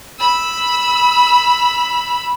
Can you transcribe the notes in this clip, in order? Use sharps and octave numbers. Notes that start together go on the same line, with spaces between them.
B5 E6